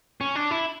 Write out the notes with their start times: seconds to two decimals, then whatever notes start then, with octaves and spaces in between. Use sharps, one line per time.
0.21 C#4
0.35 D4
0.51 E4